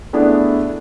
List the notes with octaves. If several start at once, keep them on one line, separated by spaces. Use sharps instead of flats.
A3 B3 D4 E4 G#4 E5